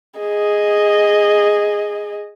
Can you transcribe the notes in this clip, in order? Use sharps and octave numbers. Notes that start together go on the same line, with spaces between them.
G#4 D#5